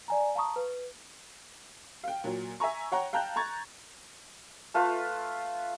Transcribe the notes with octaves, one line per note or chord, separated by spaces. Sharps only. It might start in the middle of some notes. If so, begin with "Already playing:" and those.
D5 G#5 A#5
F5 A5 A#5 C#6 D#6
B4
F5 G5
A#2 F#3
E5 G#5 A#5 C#6
C#5 F#5 G5 A#5
F5 G5 A5 A#5 F#6 G6
A#5 C#6 G#6 A6
A3 F4 A4 B4